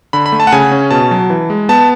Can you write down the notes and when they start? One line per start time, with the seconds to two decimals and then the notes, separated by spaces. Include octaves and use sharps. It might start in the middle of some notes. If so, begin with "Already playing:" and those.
0.13 D3 B5
0.26 B5
0.32 A3
0.40 A5
0.47 F#5
0.52 C#3 G#5
0.72 C#4
0.91 B2 A5
1.11 F#3
1.30 E3
1.50 G#3
1.69 B3 A5